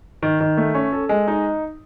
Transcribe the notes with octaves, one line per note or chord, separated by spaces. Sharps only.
D#3
D#3
A3
C#4
A4
G#3
D#4